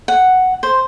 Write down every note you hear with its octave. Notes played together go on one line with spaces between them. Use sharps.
F#5
C5